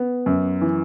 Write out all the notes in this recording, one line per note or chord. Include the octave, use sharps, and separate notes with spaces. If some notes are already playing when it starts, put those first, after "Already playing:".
Already playing: B3
F#2
E3